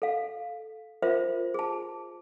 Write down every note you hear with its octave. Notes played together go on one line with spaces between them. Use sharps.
A4 F5
F4 A#4 C5 E5
G#4 A5